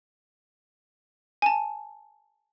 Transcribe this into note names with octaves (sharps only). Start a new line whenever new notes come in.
G#5 A5